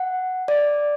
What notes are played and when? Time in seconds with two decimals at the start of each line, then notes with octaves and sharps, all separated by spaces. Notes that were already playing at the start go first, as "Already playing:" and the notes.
Already playing: F#5
0.48 D5